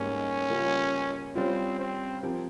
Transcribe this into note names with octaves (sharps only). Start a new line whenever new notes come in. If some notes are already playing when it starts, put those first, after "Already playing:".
Already playing: G#2 G3 A#3 C#4
C#3 G3 A#3 F4
G3 C4 C#4 F4
C4
F3 C4 G4 A#4